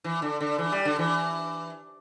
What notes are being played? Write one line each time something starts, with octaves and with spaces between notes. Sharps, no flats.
E3
D3
D3
E3
G3
D3
E3